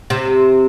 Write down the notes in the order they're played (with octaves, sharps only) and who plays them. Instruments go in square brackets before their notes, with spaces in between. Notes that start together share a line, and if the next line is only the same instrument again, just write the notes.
[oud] C3